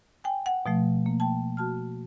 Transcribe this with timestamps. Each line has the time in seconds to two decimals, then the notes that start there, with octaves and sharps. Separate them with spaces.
0.24 G5 G#5
0.46 F#5
0.66 B2 F3 A3
1.06 A#3
1.20 G5 A5
1.57 F#4 A5 F6